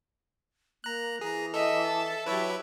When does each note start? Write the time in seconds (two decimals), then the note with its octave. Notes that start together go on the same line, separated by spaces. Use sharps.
0.84 A#3 A#5 F#6
1.21 E3 G#4 A#5
1.54 A4 D#5 E5
1.85 A5
2.26 F#3 E4 G4 B4 C#5 E5